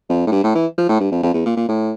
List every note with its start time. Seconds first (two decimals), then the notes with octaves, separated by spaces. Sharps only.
0.10 F2
0.27 A2
0.32 G2
0.44 A2
0.55 E3
0.78 F3
0.89 A2
1.00 G2
1.11 F2
1.23 F2
1.34 E2
1.46 A#2
1.57 A#2
1.68 A2